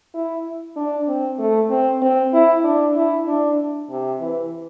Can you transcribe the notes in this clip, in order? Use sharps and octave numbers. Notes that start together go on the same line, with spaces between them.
E4
D4
C4
A3
C4
C4
E4
D4
E4
D4
C3
E3